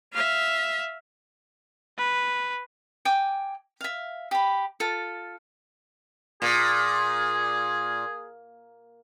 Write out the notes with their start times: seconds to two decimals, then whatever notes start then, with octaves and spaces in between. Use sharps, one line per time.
0.13 E5 F5
1.98 B4
3.05 G5 G#5 D6
3.81 E5 F5
4.31 G4 B5
4.80 F4 A4
6.42 A#2 G#4